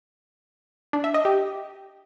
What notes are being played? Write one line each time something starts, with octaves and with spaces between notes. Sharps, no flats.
D4
E5
D#5
G4